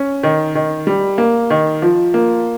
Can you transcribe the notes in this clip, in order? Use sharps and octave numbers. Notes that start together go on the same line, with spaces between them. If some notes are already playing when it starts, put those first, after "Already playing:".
Already playing: C#4
D#3
D#3
G3
A#3
D#3
F3
A#3